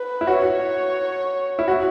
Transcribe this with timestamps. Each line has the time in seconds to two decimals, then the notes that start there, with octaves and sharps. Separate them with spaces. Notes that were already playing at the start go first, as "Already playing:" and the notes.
Already playing: B4
0.21 E4
0.27 F#4 C#5
1.59 E4
1.68 F#4